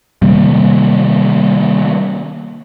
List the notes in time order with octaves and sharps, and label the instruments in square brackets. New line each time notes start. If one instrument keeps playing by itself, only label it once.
[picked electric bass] C3 D#3 G3 A#3